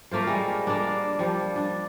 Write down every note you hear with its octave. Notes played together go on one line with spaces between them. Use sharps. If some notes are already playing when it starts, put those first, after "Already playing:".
A3 A#3 F4 C5
G3 G#3
A#3 D4
F3 G3
D4